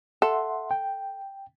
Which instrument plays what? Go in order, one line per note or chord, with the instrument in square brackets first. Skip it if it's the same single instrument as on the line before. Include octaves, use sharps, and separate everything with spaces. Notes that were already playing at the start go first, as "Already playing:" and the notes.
[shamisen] A4 [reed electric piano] E5 F#5 C6
[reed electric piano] G5